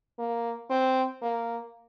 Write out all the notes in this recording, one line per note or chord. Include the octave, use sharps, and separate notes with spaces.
A#3
C4
A#3